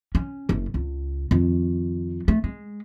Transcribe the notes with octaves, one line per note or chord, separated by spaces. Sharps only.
C#4
F#1
C#2
F2 D#3
A3
G#3